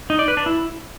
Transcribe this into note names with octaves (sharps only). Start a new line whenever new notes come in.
D#4
D5
B4
D4
E4